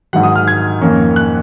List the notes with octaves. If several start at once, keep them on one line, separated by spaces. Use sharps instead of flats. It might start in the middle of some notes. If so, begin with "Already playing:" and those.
G#2 D#3 F#3 F#5
D#6
F6
G#6
F2 D#3 A#3 C#4
F#6